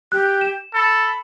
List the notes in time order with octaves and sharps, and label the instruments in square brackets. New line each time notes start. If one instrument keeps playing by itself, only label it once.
[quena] G4 [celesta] F#6
[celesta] E7
[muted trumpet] A4 [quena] B5